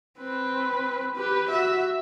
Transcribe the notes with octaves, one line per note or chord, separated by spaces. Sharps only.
C4 B4
G4 B4
F#4 E5